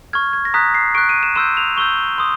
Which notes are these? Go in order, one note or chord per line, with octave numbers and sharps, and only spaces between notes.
C#6 F6 G#6
G#6
A#6
A#5 D#6 F#6 B6
C7
C#6 F#6 D7
D#7
E7
C6 E6 G6 E7
F7
C#6 E6 G6 G7
C6 D#6